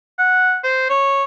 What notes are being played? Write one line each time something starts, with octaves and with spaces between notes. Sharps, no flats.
F#5
C5
C#5